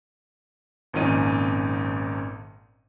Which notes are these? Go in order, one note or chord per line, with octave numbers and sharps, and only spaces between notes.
G#1 F2 A#2 C#4 D#4 D#7